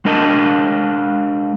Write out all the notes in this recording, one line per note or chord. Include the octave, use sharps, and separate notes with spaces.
G#3 D4 A#4 D#5 A5